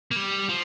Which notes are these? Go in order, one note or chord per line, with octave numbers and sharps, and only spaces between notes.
A#3
G3
F3